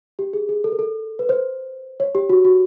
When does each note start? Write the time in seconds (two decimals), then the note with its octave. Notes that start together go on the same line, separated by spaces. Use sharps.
0.19 G4
0.33 G#4
0.49 G#4
0.64 A4
0.72 A#4
0.79 A4
1.19 B4
1.29 C5
2.00 C#5
2.15 G4
2.29 F#4
2.45 F#4